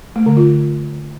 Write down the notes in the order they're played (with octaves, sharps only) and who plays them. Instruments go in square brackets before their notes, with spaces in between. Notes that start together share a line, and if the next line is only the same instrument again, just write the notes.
[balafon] A3
D3
F4